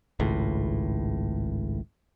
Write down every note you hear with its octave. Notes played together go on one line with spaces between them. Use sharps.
G#1 C#2 A2